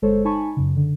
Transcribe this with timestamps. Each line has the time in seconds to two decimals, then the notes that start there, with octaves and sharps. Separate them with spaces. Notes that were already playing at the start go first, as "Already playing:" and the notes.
0.02 G1 G#3 A4 C5 C#5
0.25 D#4 G#5 A5 B5 C#6
0.57 F#2 C#3
0.77 D3